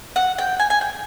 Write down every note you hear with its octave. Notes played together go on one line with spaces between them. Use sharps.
F#5
G5
G#5
G#5
G5